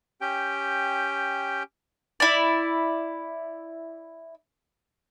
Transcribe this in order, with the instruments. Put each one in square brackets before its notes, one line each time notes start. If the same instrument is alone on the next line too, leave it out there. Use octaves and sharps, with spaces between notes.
[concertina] C#4 G4 G5
[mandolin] E4 D5